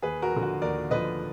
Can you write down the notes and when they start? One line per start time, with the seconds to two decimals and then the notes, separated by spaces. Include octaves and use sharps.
0.02 D#2 G#4 B4
0.22 F#4 A#4
0.32 D3 F3
0.42 F#4
0.62 D#2 A#4 D5
0.91 D3 F3 B4 D#5